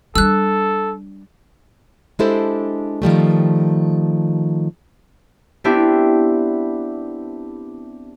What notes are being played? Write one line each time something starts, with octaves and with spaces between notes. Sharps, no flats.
G3 D4 A4 E6 F#6
G#3 D4 E4 G4 A4 C5
D#3 F3 G3 A3
B3 C4 D4 E4 G4